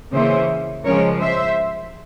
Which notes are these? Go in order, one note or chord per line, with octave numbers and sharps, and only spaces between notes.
C#3 E3 A#3 C#4 C5 E5
C#3 F3 G#3 C#4 A#4 C#5
C5 E5